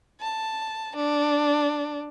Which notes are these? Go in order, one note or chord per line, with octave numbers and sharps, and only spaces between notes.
A5
D4